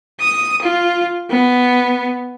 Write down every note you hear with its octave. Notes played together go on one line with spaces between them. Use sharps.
D#6
F4
B3